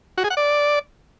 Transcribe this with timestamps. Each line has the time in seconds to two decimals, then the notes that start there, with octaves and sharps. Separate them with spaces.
0.18 F#4
0.24 G#4
0.30 F#5
0.37 D5